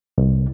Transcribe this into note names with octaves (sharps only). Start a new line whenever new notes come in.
C2